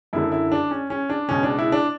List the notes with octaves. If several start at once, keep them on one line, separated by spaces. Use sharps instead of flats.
F#2 D3 E4
E4
D4
C#4
C#4
D4
C#2 B2 C#4
D4
E4
D4